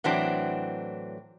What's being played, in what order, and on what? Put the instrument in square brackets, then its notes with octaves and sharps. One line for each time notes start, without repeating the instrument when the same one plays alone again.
[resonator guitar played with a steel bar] A2 E3 F#3 C4 D4